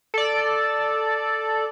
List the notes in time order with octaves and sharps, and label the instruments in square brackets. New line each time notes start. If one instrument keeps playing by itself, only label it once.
[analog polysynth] A4 D5